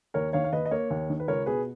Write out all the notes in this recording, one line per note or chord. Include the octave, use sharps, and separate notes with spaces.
D#2 A#4 C#5
D#3 C#5 F5
F5
D#2 B4 D#5
D#5
A#3 A#4 C#5
D#2
D#3
B4
C#2 A#4 C#5
B2 G#4 B4